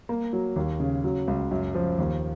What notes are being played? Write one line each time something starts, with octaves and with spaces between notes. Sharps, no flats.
A#3
F#3
D#2
C#3
F#3
C#2
F#2
F3
D#2